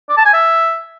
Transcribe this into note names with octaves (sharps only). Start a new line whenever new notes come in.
D5
A5
G#5
E5